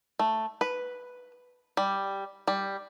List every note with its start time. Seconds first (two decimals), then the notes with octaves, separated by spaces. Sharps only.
0.19 A3
0.61 B4
1.77 G3
2.48 G3